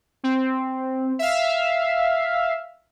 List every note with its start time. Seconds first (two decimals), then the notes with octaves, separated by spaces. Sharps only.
0.24 C4
1.19 E5 F5